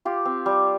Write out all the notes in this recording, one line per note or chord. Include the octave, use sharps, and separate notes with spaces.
F4 G4
C4
G3